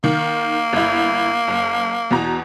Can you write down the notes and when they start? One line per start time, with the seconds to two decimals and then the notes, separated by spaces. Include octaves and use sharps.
0.04 D#3 A#3
0.73 G1 E4
1.48 F#1
2.11 E2 B2 A#5